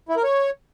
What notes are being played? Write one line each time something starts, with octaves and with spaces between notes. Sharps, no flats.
E4
A#4
C#5